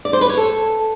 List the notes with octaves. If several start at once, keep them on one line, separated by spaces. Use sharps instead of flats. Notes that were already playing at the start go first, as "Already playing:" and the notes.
D5
C5
B4
C#5
A4